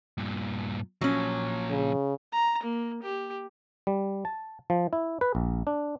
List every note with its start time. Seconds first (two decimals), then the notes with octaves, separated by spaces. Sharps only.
0.18 G2 A#2
1.01 A#2 F3 F#3 C#4
1.70 C#3
2.32 A#5
2.63 A#3
3.02 G4
3.87 G3
4.25 A5
4.70 F3
4.93 E4
5.21 B4
5.35 A#1
5.67 D4